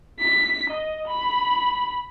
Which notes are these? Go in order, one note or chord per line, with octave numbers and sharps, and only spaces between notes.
B6
D#5
B5